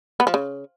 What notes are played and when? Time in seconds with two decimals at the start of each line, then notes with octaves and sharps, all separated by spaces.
0.20 B3
0.27 F3
0.34 C#3